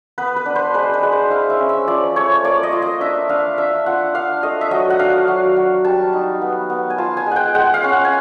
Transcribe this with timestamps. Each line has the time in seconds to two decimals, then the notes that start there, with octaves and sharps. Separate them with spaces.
0.18 B3 B4
0.36 B4
0.46 D4
0.56 C5
0.74 G#3 B4
0.94 B4
1.03 G#3
1.12 C5
1.31 E4 F5
1.50 E5
1.60 C#4
1.69 E5
1.87 F3 D5
2.16 A3 C#5
2.44 A#3 D5
2.63 D#5
2.73 F4
2.82 D#5
3.01 D4 E5
3.29 D4 F5
3.58 D4 E5
3.86 F4 F#5
4.14 D4 F5
4.43 A3 D#5
4.61 E5
4.71 F#3 D#5
4.90 F#5
4.99 D4 F5
5.28 F#3
5.56 F#3
5.85 G3 A5
6.13 D#4
6.42 B3
6.70 B3
6.90 G#5
6.98 F4 A5
7.17 G#5
7.26 G#3
7.31 F#5 G5
7.55 G#3 F#5
7.74 F5
7.83 C#4
7.92 F#5
8.05 G#5